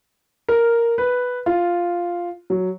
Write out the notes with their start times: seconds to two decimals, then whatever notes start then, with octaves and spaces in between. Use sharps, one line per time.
0.49 A#4
0.98 B4
1.46 F4
2.50 F#3